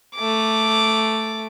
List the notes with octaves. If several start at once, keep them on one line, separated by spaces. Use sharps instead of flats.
A3 D6